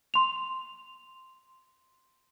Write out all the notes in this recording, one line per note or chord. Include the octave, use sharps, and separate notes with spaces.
C6 F7